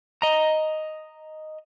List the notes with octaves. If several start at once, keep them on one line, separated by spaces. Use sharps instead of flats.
D#5 A#5